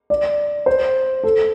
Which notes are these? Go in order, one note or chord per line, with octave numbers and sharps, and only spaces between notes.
D5
C5
A4